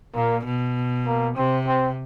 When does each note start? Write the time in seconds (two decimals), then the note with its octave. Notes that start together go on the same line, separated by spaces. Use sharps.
0.15 A#2 A#3
0.45 B2
1.07 A#3
1.37 C3 C4
1.67 C4